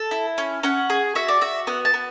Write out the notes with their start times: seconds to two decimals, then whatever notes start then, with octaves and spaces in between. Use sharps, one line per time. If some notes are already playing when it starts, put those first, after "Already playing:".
Already playing: A4
0.11 E4
0.38 C#4
0.63 C#4 F#5
0.90 G#4
1.15 F#4 E5
1.28 D5
1.41 F#4 E5
1.67 B3 F#5
1.85 A5
1.94 B3